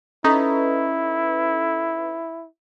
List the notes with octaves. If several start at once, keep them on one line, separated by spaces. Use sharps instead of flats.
C#4 D#4 E4 A4 B4